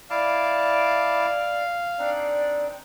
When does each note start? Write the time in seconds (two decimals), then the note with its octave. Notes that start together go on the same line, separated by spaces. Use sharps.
0.10 E4 D5 F5 A5 D6
1.99 C4 D4 D#4 D5